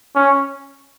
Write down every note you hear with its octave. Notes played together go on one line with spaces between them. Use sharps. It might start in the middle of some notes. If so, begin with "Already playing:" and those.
C#4